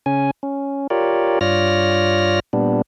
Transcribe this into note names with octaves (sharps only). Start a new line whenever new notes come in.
C#3 C#4 G#5
C#4
F4 G4 A#4 C#5 D5
G2 F4 C#5 D5 F6 A#6
A#2 G3 B3 D4